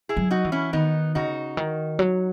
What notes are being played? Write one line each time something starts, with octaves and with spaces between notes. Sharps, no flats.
E4 G#4
F#3
D#4 F#4
E3
C#4 E4
D#3 B3 D#4
C#3 D#4 F#4
D#3
F#3